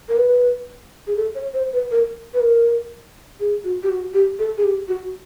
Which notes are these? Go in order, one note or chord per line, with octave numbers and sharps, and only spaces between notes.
A#4
B4
G#4
A4
C#5
C5
B4
A#4
B4
A#4
G#4
F#4
G4
F#4
G4
A4
G#4
G4
F#4